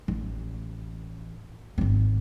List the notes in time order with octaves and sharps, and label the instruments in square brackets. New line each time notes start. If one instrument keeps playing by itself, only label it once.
[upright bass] A1
G#1 C4